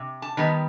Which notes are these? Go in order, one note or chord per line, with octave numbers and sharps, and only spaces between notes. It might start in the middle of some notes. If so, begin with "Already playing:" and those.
Already playing: C3
A5
D#3 G3 B3